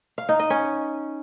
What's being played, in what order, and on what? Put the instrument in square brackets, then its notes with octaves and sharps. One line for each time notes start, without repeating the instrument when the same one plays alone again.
[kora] F5
D#4
D#5
C#4